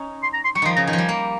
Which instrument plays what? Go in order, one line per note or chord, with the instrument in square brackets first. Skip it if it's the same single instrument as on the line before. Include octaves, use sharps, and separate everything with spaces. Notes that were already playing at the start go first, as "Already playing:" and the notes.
Already playing: [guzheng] C#4 D#4
[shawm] C6
A#5
C6
[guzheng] G3 [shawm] C#6
[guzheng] D#3 F3 [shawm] C6
[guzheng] C#3 [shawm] A#5
[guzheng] D#3 [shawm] G#5
[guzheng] F3
G3
A#3